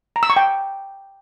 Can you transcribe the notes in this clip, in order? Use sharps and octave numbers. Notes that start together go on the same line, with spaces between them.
A#5
E6
C#6
G5